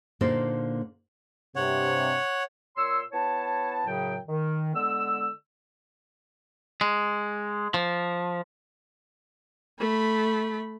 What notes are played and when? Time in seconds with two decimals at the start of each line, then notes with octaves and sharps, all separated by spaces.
0.21 A#2 D3 A#3 D#4 A4 C5
1.56 G2 C3 C#5 F#5
2.77 A#2 C#5 C6 E6
3.12 B3 E4 C#5 A5
3.86 F#2 A2 C#3 F#3 G5
4.27 D#3
4.75 D3 G#3 B3 E6
6.81 G#3
7.74 F3
9.79 A3 B5